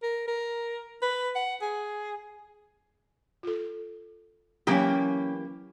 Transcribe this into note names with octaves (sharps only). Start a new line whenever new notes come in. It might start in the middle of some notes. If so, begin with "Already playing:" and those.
A#4
A#4
B4
F#5
G#4
F4 A4
E3 F#3 A#3 C#4 D#4 G4